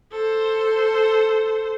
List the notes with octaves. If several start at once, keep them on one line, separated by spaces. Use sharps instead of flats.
A4 C5